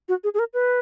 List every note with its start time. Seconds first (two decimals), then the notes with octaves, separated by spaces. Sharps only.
0.09 F#4
0.24 G#4
0.34 G#4
0.39 A#4
0.54 B4